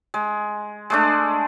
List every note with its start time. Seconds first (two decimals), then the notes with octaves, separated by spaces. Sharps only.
0.14 G#3
0.90 G#3 A3 D4